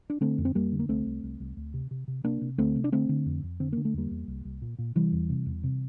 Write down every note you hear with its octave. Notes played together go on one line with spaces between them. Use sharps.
D4
D3 A3 C4
F2
C4
F2 G3 A#3
D3
A#3
C2 A3 C4
C2
C2
C2
D2
C3
C3
C3
C3 A#3 D4
C3
D2 A3 C4
C3
D4
D3 A3 C4
D3
F2
F2
D3 C4
D3 A#3
A3
E2 G3 A#3
E2
C2
C2
A#2
A#2
C3 E3 G3
E2
C3
E2
C3